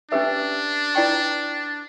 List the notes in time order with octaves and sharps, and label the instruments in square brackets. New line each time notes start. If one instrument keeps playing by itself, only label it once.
[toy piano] C#4 G4 B4 E5 [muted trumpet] D4
[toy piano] E4 B4 D5 G5 C#6